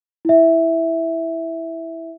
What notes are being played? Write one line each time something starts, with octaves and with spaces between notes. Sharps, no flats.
E4 E5